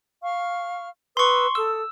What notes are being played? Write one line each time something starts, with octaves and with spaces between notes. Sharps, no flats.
F5 C#6 F6
B4 C6 C#6 D#6 E6
A4 D#6 E6